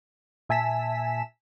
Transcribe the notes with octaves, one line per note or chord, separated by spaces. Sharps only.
A#2 E5 G#5 A5 B6 E7